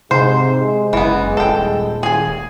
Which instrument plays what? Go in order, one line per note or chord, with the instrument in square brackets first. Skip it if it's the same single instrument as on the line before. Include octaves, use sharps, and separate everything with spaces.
[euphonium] G#2 [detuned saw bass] C3 [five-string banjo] C5
[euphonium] G#3
[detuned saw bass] F#1 [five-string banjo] E3 B3
[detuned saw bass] D#1 [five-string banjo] A4 G5
[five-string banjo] G#4 G#5